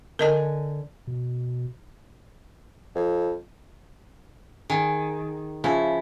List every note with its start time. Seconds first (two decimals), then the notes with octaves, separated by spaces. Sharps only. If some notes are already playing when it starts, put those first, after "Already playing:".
0.19 D3 A#4 D#5 G#5 A5
1.07 B2
2.95 F2
4.70 D#3 G#4
5.64 C#3 F3 C#4 E4